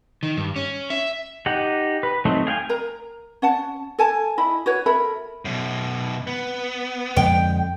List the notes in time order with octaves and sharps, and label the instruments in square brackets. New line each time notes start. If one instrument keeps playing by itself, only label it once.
[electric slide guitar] D#3
G2
C#4
E5
[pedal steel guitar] D#4 G4 F#5
B4
F#3 A3 C4 D#4
G#4 F5 G5 G#5
[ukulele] A#4 A#5
C#4 F#5 A5
A4 G#5 A5
E4 D#5 B5
F#4 B4 C#5
A4 A#4 E5 B5
[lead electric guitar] F#2 B2
B3
[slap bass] F2 D3 G#3 [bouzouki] G5